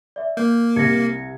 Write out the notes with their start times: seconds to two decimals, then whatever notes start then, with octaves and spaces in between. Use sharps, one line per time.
0.16 D5 E5
0.37 A#3 G6
0.76 C2 G#6 A#6 C#7